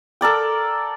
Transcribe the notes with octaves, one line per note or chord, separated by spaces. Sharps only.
A4 A#4 D5 G5